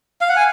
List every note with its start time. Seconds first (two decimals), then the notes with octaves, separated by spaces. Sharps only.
0.21 F5
0.29 F#5
0.37 G#5